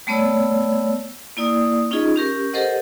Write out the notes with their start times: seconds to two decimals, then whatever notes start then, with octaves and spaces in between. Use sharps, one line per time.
0.07 G3 A3 B3 C#5 D5 E6
1.37 A#3 E4 D5 D#6
1.91 C#4 D#4 F4 G#4 D#5
2.16 C#4 G4 A#4
2.53 G4 A4 A#4 C5 D#5 F#5